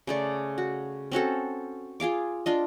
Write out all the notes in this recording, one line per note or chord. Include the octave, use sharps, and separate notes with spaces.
C#3 A3 D5
F#4
C4 C#4 F#4 A4
F4 G#4 F5 D6
D4 F4 D#5